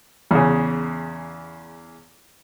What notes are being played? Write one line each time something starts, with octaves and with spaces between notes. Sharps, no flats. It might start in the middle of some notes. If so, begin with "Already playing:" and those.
E2 C#3